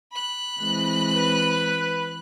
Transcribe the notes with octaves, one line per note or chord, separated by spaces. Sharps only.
B5 F#6
E3 G#3 C4
B4